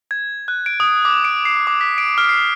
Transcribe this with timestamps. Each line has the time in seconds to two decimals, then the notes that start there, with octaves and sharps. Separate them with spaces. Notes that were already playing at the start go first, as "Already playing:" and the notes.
0.11 G#6
0.48 F#6
0.66 D7
0.80 D#6
1.05 D6
1.25 D7
1.45 C7
1.67 D6
1.81 B6
1.98 D7
2.18 F6
2.29 C7